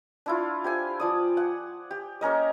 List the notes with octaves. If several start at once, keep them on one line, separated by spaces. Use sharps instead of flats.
D4 E4 F4
G4 C5 G#5
F3 D5 D#6
F#5
G4
A#3 C#4 A#4 D#5